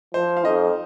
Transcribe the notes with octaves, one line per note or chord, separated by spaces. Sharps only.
F3 C5
F5
F2 D#4 D#5